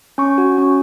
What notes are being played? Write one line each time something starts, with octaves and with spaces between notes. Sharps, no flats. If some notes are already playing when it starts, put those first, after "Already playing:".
C#4 C#6
F#4
C#4